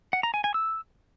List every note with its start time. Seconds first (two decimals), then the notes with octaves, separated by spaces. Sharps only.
0.13 F#5
0.23 A#5
0.34 G#5
0.44 G#5
0.54 E6